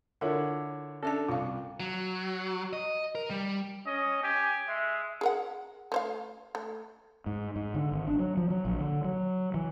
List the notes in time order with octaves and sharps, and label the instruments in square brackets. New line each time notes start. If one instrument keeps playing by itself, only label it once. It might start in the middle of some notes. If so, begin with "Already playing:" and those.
[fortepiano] D3 E4 C#5 [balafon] F4 A4 A#4
[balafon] C#4 E5 A5 [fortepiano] D4 A4
[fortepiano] C2 [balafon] F4 F5
[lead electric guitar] F#3
D#5
A#4
G3
[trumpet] C#4 [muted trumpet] D#5
[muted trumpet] G4 [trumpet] G#5
[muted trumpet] G#3 [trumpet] E5
[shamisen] G#4 A#4 F#5
A3 C5 F5
A3
[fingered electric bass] G#2
G#2
D3
G#1
D4
F#3
F3
F#3
A#1
D3
F#3
E3